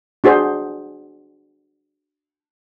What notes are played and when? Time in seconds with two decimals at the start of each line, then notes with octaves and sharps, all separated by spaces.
0.24 D4 F#4 G#4 C5